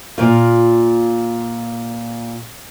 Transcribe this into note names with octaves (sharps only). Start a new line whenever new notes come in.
A#2 F4